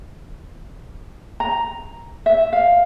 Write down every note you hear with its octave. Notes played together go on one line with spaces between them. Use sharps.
A#5
E5
F5